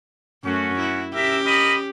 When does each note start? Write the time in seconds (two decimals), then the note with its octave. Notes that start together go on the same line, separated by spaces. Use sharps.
0.45 F#2 A3 C#4 F#4
0.79 E4
1.14 C#4 G4 A#4 E5
1.46 A#4 D#5 B5